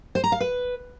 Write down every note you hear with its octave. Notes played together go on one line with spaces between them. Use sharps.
C5
A#5
F5
B4